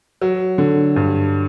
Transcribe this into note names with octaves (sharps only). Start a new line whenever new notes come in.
F#3
D3
G2